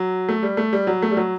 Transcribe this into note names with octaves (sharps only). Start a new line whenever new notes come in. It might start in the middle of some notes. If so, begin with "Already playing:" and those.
Already playing: F#3
A3
G3
A3
G3
F#3
A3
G3
F#3